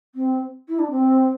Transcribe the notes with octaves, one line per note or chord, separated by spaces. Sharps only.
C4
E4
D4
C4